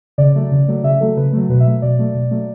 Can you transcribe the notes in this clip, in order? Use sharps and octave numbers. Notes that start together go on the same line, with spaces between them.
C#3 D5
F#3 A3
C#3
F#3 A3
C#3 E5
F#3 A3 A4
C#3 B4
F#3 A3
B2 B4
E5
F#3 A3
B2 D5
F#3 A3
B2
F#3 A3